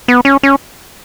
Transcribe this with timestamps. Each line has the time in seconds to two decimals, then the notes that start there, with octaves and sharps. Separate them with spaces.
0.08 B3
0.25 C#4
0.43 C#4